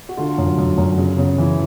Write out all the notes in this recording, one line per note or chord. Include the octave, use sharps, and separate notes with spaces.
F#4
D3 F4
F#2
F#2
F#2
C#3
C#3
E3